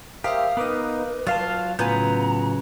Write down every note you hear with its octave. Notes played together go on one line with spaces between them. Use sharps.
G4 A#4 C5 E5 F5 D#6
B3 D#4 A#4 B4 D6 D#6
F#3 F4 F5 A5
A2 C#3 F#3 B3 F4 G#5 A#5 G6